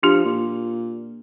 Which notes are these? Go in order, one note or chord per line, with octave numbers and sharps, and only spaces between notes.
F3 D4 G4
A#2